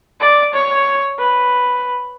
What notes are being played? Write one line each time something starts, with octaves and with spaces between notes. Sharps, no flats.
D5
C#5
B4